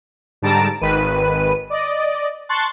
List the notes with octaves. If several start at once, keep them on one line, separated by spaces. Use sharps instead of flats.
G#2 D3 G3 A5 A#5 D7
G#1 D#3 B4 D#7
D5 D#5
A5 C6 C#6 F#6 A6